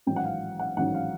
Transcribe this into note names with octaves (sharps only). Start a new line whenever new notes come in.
A1 G#2 D#3 F#3 G5
F#5
F5
F#5
A1 G#2 D#3 F#3 F#5
F5